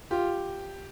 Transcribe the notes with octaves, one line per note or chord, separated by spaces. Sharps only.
F4 G4